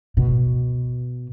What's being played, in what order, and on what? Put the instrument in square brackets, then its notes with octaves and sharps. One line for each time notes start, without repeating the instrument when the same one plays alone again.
[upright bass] B2